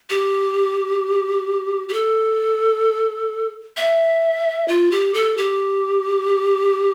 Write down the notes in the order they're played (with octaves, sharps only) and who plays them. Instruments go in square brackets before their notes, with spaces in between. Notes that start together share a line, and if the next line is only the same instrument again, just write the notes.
[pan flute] G4
G4
A4
E5
F4
G4
A4
G4